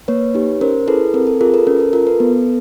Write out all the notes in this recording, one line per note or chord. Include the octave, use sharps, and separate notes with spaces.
A#3 B4 C#5
D#4 G4
C#4 A#4 C5
E4 G#4 A4 B4
C4 A#4
A4
F4 G#4 A#4
A4 B4
C#4 A#4
A4
F4 A4 A#4
A4 B4
B3